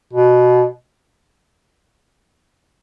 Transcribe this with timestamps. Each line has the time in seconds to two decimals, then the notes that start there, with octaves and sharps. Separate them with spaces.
0.13 B2